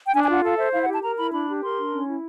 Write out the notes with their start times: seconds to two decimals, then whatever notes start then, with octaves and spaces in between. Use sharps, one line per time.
0.07 G5
0.13 D4 G#5
0.24 G#5
0.29 F4 F#5
0.43 A4 F5
0.58 C5 E5
0.73 E4 F5
0.83 F#5
0.88 G4
0.93 A5
1.03 A#4 A#5
1.18 E4 B5
1.32 D4 B5
1.48 G4
1.62 A#4 C6
1.77 D4
1.93 C#4
2.07 E4